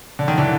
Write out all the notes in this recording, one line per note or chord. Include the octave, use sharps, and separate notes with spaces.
D3
D#3
D3 E3